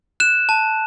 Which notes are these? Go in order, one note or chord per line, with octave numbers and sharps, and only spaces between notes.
F#6 E7
A5